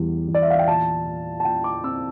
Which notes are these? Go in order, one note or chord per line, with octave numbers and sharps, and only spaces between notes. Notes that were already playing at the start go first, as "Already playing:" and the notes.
Already playing: E2 G3
E2
D5
E5
F5
G5
A#2 A5
A#2
A5
A#2 G5
D6
C4 E6